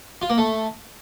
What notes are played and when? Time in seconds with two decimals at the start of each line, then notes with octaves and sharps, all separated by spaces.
0.22 F4
0.30 A#3
0.38 A3